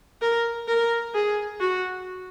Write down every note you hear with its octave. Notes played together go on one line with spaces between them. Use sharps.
A#4
A#4
G#4
F#4